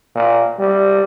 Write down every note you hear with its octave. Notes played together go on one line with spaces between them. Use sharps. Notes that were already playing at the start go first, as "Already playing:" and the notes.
A#2
G3